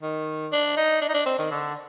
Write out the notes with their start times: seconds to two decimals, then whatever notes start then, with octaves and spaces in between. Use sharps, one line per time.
0.02 D#3
0.52 D4
0.77 D#4
1.02 D4
1.09 D#4
1.14 D4
1.26 C4
1.38 D#3
1.51 D3